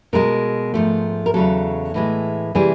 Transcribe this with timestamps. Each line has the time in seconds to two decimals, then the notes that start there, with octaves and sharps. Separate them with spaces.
0.13 B2 G#3 A#4
0.74 G#2 F3 A3
1.26 A#4
1.34 E2 C#3 F#3 A4
1.94 A2 E3 G#3
2.55 C3 E3 G3 G#4